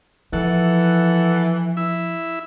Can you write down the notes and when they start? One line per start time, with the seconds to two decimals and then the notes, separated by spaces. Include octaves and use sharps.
0.33 E3 F3 A4 F#5
1.77 E4 E5